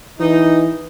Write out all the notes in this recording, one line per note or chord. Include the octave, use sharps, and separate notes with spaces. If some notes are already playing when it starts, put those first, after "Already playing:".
E3 D#4